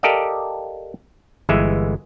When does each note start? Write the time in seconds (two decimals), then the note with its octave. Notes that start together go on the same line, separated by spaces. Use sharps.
0.03 G4 A4 A#4 D5 D#5 F5
1.49 G1 E3 G#3 E5